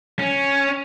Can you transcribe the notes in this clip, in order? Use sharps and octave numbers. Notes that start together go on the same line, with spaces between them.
C#4